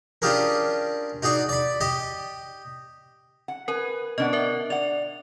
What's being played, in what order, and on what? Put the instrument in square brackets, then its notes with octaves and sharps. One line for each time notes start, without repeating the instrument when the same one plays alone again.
[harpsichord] C#4 D4 F4 G4 G#4 A#4
D#4 F#4 G#4 D5
D5 B5
G4 D#5
[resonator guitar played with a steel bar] F#5
[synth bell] A#4 [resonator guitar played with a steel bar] B4 G#5
[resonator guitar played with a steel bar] B2 D4 F#5 [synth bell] D#5
[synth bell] A#4 E5
[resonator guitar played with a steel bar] D5 F#5 [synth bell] F7